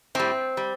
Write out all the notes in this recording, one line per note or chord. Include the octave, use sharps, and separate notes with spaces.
A2 G3 C4
G3